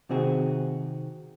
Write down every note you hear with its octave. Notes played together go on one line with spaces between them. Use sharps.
C3 D#3 C4 F#4 G#4